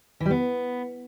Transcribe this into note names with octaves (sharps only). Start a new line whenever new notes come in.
E3
G3
B3